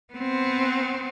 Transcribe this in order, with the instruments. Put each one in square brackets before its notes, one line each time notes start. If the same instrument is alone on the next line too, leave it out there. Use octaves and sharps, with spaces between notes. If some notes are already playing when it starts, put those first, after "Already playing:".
[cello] B3 C4